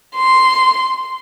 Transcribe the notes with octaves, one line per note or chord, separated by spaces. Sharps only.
C6